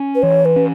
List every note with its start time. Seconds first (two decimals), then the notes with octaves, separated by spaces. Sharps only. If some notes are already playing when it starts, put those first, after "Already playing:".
Already playing: C#4
0.15 B4
0.22 E3 C#5
0.45 B4
0.56 C#4